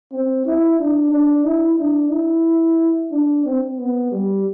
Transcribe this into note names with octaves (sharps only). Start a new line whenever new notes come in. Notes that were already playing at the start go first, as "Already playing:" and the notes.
C4
E4
D4
D4
E4
D4
E4
D4
C4
B3
G3